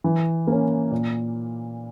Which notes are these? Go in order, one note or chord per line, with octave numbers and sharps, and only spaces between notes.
E3
A#3 C#4
A#2